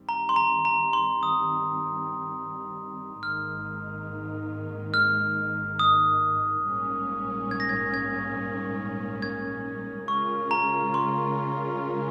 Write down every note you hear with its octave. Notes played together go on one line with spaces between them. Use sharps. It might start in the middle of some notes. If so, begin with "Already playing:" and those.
Already playing: G2 D#3 G3 C4
A#5
C6
A#5
A#5
C6
D#6
G#1 G#2 D#3 A#3 D#4 F6
F6
D#6
A#1 G#2 G3 A#3 C#4
G#6
A#6
G#6
G#6
G#6
C#3 G#3 C#4 F4 A#4 C#6
A#5
C6